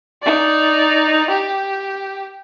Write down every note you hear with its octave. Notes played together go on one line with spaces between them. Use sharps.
D#4 D5
G4